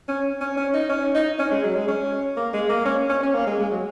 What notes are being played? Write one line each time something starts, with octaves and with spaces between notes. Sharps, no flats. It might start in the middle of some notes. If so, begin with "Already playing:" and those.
C#4
C#4
C#4
D#4
C#4
D#4
C#4
G#3
F#3
G#3
C#4
A#3
G#3
A#3
C#4
C#4
C#4
A#3
G#3
G#3
F#3